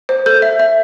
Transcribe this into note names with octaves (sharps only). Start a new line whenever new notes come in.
C5
A4 G6
E5
E5